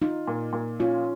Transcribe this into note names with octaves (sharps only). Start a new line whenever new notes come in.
D#4 F4
A#2
A#2
C#4 F4